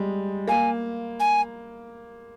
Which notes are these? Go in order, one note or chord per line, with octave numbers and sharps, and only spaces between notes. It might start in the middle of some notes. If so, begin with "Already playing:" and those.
Already playing: G3 G#3
A#3 G#5
G#5